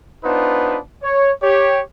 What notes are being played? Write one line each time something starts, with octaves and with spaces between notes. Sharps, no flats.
B3 D4 D#4 F4 B4 C5
C#5
G4 C#5